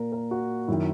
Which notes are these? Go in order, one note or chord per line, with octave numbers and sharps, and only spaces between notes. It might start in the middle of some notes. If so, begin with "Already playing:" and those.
Already playing: A#2 A#4
A#4
F#4
F#2 D#3 E4